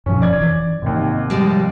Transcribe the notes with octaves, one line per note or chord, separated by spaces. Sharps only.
G2 B2 F3 C#4
F1 D5 G#6
E3
G#1 D#2 G#2 C3
F3 G3 G#3